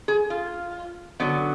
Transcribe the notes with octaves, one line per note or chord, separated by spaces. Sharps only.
G#4
F4
D3 F#3 B3